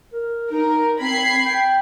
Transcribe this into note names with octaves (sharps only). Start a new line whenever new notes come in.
A#4
D#4 A#4
C4 B5 G#6 C7
G5